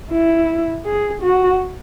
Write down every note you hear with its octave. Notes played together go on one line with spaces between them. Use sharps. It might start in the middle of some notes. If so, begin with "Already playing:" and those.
E4
G#4
F#4